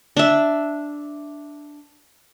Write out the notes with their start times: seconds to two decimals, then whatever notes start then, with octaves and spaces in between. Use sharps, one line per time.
0.17 D4 E5